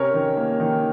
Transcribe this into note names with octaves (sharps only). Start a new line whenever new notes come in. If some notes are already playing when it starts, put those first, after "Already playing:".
Already playing: C3 C#4 A#4 C#5
D#3
A#3
D#3